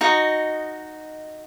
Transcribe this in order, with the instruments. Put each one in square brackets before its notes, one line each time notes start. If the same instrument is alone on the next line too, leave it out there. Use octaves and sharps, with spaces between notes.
[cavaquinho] D#4 F#4 D#5